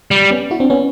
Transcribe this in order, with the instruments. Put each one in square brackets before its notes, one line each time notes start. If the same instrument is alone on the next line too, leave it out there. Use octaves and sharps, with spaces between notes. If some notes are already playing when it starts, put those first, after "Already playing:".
[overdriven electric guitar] G3
[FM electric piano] B3 C#4
E4 F#4
C4 D4
B3 C#4